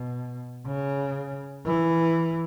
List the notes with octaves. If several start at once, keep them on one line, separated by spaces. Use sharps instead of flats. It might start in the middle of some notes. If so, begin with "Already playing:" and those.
Already playing: B2
C#3
E3